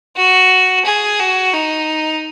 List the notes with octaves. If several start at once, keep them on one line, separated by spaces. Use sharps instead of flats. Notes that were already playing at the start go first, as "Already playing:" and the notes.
F#4
G#4
F#4
D#4